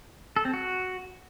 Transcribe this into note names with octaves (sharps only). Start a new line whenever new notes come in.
A4
C4
F#4